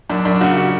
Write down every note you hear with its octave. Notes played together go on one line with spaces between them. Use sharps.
F#2 D4
F#2 D4
C#3 F#4
F#4